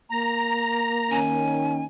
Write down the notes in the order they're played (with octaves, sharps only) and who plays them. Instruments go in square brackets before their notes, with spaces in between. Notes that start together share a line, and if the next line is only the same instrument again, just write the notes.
[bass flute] A#3 [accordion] A#5
[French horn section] D#3 C#4 [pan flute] G#5